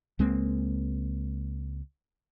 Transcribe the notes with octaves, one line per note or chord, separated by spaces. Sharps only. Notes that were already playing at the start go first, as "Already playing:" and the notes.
C#2 G#3 A#3 C4